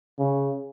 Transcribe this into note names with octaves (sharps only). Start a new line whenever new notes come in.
C#3